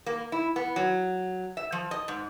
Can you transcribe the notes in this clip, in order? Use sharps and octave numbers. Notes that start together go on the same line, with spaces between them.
A#3
E4
B3
F#3
E5
F3
D#5
G#2